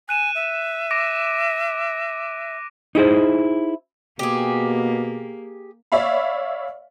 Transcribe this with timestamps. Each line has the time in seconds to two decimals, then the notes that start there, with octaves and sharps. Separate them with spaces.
0.09 G#5 F#6 D#7 E7
0.35 E5
0.91 D6 A#6 D7
2.95 D#4 E4 G#4 C5
4.19 B2 A#3 G4 G#4
5.92 C#5 D5 E5 F5 B5